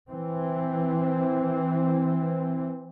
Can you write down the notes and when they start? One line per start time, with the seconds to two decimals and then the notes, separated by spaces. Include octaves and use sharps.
0.11 E3 C4